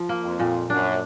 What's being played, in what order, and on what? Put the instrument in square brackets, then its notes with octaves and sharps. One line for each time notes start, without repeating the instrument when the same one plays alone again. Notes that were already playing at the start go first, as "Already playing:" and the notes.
Already playing: [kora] F3
A#3
[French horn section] F2
[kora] A#2
[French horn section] F#2 [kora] D4